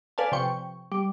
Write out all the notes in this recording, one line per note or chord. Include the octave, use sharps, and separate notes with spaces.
A4 B4 D5 F5 G#5 A5
C3 F3 G5 C#6
G3